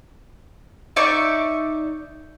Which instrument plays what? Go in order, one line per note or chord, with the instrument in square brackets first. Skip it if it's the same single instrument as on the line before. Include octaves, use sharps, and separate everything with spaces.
[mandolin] D#4 D5 E5 C#6